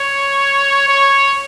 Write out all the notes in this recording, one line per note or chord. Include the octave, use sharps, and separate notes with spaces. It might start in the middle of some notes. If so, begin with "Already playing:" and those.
Already playing: C#5
C#5